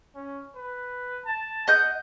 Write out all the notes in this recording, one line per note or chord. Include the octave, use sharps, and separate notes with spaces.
C#4
B4
A5
D#5 F#5 G6